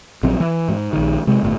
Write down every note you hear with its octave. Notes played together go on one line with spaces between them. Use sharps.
A#1 F#3 C4
E3
G#2
A#1 D#3
C3 G#3
G1 A2